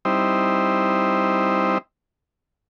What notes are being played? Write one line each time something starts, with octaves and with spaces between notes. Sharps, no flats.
G3 C4 D#4 E4 C5